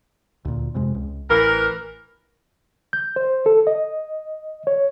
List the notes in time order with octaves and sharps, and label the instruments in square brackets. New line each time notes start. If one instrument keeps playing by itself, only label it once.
[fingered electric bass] D2 A#2
F2 C3 G#3
C#2
[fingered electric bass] A1 [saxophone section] E3 A#4
[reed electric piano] G6
C5
A4
D#5
C#5